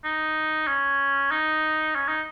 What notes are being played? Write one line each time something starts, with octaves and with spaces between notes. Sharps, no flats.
D#4
C#4
D#4
C#4
D#4